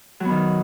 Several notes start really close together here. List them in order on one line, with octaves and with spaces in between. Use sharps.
F#3 B3 D#3